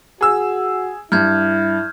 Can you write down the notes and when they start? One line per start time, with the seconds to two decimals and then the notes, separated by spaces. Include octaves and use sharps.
0.21 F#4 G#4 E6
1.12 G2 E4 F6 G6 G#6